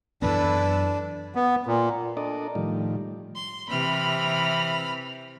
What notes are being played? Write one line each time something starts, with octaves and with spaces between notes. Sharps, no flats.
F#2 E3 B3 D4 E4 A4 B4
B3
A#2
D4 A4 A#4 D5 D#5
A2 D#3 F3 G3
C6
C3 E3 B5 F6